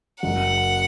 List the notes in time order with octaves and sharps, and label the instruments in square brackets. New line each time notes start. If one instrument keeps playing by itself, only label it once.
[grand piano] F#1 F#2 F#3 [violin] F#5